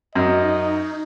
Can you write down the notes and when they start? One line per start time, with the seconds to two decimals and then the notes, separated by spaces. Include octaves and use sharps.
0.15 F#2 D#4 D#5